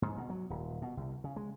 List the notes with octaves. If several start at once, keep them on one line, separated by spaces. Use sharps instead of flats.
G#2
B2
F#3
D#1
B2
C2
C#3
G#3